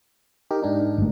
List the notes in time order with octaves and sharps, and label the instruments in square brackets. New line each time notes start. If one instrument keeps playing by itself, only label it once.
[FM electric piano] D#4 G4 A#4
G#2 D4 D#4
[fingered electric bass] G1 A3